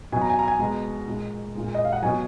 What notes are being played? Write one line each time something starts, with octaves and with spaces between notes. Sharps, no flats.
B2 F#3 G#5
A#5
G#5
A#5
G#5
B2 G#3 A#5
A#2 G#3
A#2 G#3
D#5
F5
F#5
B2 F#3 G#5